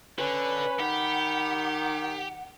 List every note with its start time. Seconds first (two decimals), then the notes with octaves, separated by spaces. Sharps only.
0.19 D3 C#4 B4 B5
0.80 D#3 G4 F#5